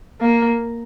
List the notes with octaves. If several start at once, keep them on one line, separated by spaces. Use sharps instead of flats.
A#3